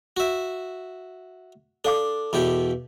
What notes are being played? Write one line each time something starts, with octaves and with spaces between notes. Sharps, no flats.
F#4 E5
D4 A4 F5 D6
E2 B2 G4